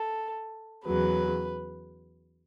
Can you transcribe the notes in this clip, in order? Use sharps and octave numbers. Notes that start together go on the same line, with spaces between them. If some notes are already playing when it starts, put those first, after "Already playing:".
Already playing: A4
E2 C#3 F#3 B4